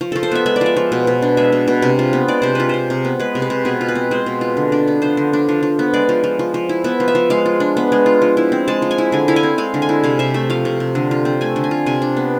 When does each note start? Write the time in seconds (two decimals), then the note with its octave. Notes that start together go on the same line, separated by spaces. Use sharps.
0.01 F3
0.12 F3 A4
0.23 C5
0.32 B3 E5
0.46 G#3 E5
0.56 D5
0.61 F3 E5
0.77 F3
0.92 B2
1.07 B2
1.22 D4
1.37 G#3 E5
1.52 B2
1.68 B2
1.82 C3
1.99 F4
2.13 B3
2.28 G#3 D5
2.42 C3 C5
2.55 F4 B4
2.69 C3 C5
2.90 C3
3.05 B3
3.19 G#3 B4
3.35 C3
3.42 B4
3.50 C3
3.65 B2 G#4
3.81 F4
3.88 B4
3.95 C4
4.11 G#3 C5
4.26 B2
4.41 F4
4.57 D3
4.72 D4
4.88 B3
5.02 F3 C5
5.17 D3
5.33 D4
5.49 F3
5.63 F3
5.79 B3
5.94 G#3 D5
6.09 F3
6.24 F3
6.39 F3
6.54 F3
6.69 E4
6.84 B3 E5
7.00 F3
7.08 E5
7.15 F3
7.30 G#3 F5
7.46 F4
7.60 D4
7.77 B3
7.92 G#3
8.06 F4
8.22 F3
8.37 E4
8.52 C4
8.68 G#3 A5
8.82 F3
8.91 G#5
8.98 E4
9.12 D3 G#5
9.28 E4 F5
9.36 G#5
9.43 C4
9.58 G#3 F5
9.74 D3
9.82 G#5
9.89 E4
10.04 C3 F5
10.19 C3 E5
10.34 A3 E5
10.50 F3 F5
10.65 C3
10.80 C3
10.95 D3
11.11 F4
11.25 C4
11.41 A3 G#5
11.56 D3
11.64 G#5
11.71 F4
11.86 C3 G#5
12.02 D4
12.17 B3